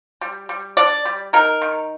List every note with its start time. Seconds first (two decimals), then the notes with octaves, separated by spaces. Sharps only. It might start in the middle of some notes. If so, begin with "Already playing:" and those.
0.21 G3
0.49 G3
0.77 D4 D5
1.05 G3
1.33 D#4 A#4
1.61 D#3